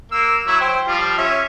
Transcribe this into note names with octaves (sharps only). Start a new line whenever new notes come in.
A#3 E6
F#3 E4 E6
C5 G5
F3 G3 F4
C#4 E5